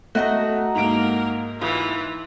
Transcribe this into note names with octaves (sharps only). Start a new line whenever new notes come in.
A3 F#4 D#5 A#5
G#2 A#3 A#4 D7
E3 F4